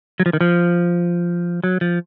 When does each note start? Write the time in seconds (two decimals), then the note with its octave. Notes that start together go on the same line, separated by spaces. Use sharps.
0.20 F#3
0.26 F3
0.33 D#3
0.41 F3
1.64 F#3
1.81 F3